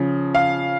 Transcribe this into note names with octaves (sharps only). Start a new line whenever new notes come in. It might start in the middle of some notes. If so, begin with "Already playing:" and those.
Already playing: C#3 F3
F5